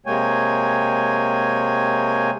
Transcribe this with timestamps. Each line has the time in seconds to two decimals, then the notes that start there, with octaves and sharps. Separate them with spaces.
0.06 C3 G#3 A#3 C#5 G5 G#5